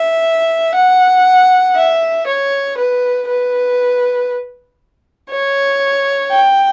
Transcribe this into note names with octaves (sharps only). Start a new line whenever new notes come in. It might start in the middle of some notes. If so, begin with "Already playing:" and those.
Already playing: E5
F#5
E5
C#5
B4
B4
C#5
G5